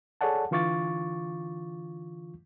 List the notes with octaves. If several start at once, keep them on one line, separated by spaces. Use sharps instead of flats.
G#4 A4 C#5 D5 F#5 A5
D3 E3 F4 C#6 D6 A6